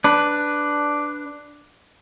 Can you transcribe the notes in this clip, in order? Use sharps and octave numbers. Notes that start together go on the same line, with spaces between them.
D4 B4